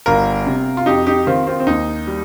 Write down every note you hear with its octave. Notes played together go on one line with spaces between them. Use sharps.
G1 F4 A#4
C3
F4
F2 D#4 G4
D#4 G4
D#3 C4 F4
C4 F4
C4
D#2 D#4
G3